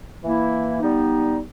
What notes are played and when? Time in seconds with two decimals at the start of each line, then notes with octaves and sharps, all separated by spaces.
0.23 E3 A#3 E4
0.81 G3 B3 D#4